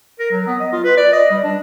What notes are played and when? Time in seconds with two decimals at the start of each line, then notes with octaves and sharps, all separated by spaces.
0.19 A#4
0.31 F#3
0.47 B3
0.60 D#5
0.72 F4
0.84 B4
0.97 D5
1.12 D#5
1.31 G3
1.43 D4